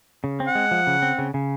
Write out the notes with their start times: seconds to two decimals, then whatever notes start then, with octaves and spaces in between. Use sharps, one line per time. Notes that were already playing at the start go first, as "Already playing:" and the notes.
0.24 C#3
0.40 C4
0.47 F#5
0.55 G#3
0.71 F3
0.87 C#3
1.02 C4
1.18 C#3
1.34 C#3